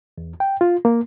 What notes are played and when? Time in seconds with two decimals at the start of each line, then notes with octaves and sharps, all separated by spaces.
0.18 E2
0.40 G5
0.61 F4
0.85 A#3